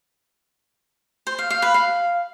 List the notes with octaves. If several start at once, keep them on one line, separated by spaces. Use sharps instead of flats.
C5
F5
F5
B4
F5